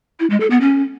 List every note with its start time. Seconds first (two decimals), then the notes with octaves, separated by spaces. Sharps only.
0.20 E4
0.30 G#3
0.40 A4
0.51 B3
0.61 C#4